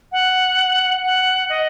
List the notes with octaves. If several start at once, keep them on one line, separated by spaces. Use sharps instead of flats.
F#5
F#5
D#5